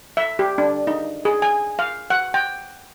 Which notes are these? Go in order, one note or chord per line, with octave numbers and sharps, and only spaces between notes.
E5
G4
D4
D#4
G#4
G#5
F5
F#5
G5